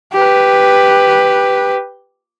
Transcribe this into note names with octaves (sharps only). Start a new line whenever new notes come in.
G4 B4